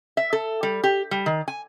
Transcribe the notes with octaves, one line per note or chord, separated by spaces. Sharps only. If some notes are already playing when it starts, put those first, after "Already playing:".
E5
A4
G3
G4
G3
D#3
G#5